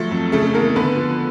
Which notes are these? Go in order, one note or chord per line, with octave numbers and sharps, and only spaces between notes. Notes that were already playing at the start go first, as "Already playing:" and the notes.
Already playing: F3 F#3 A3 A4
F2
C#3 A3 A4
E2 A#3 A#4
D3 B3 B4
F3